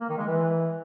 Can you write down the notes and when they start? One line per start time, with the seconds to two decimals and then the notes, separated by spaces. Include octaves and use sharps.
0.01 A#3
0.10 D#3
0.18 G#3
0.27 E3